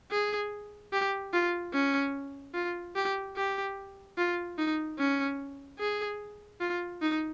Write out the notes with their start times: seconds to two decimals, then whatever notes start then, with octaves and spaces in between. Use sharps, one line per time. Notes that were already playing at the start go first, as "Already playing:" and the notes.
0.11 G#4
0.93 G4
1.33 F4
1.73 C#4
2.55 F4
2.96 G4
3.36 G4
4.17 F4
4.58 D#4
4.99 C#4
5.79 G#4
6.61 F4
7.02 D#4